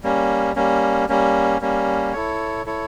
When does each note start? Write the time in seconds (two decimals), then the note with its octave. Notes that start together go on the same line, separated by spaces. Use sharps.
0.03 G3 A#3 C#4
0.56 G3 A#3 C#4
1.09 G3 A#3 C#4
1.61 G3 A#3 C#4
2.13 E4 A4 C#5
2.66 E4 A4 C#5